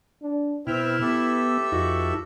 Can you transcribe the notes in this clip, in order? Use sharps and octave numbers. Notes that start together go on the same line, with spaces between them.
D4
B2 C4 E4 B4 E5 G5 F6
B3 G4 A4 E5
F2 D#4 F4 F#4